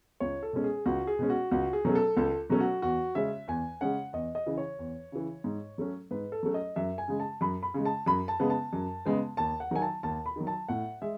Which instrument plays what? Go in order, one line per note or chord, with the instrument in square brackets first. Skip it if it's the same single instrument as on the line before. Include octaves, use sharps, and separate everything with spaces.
[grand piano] C#2 C#5
A4
B2 G#3 C#4
G#4
C#2 F#4
G#4
B2 G#3 C#4
F#4
C#2 F#4
G#4
B2 F#3 A3 C#4
A4
C#2 A4
B2 F#3 A3 C#4
F#4
E2 F#4
C#3 G#3 C#4 E5
E2 G#5
C#3 G#3 C#4 F#5
E2 D#5
D#5
C#3 E3
C#5
E2
C#3 E3
G#2
F#3 A3 C#4
G#2 B4
A4
F#3 A3 C#4
D#5
F#2 E5
G#5
C#3 G#3
A5
F#2 B5
B5
C#3 G#3
A5
F#2 B5
A5
C#3 G#3 B3
A5
F#2
C#3 G#3 B3
D#2 A5
F#5
D#3 F#3 G#5
A5
D#2 A5
B5
D#3 F#3
A5
A2 F#5
G#3 E5